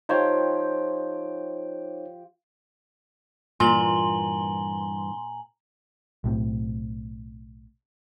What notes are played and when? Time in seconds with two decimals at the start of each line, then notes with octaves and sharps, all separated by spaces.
0.09 F3 D#4 G4 C5 C#5 G5
3.60 G2 A#2 E3 G#5 A#5 C6 F#7
6.24 B1 A2 C3